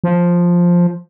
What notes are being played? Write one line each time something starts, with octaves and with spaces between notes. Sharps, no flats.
F3